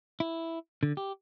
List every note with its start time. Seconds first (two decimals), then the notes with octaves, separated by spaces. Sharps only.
0.20 E4
0.83 D3
0.97 G4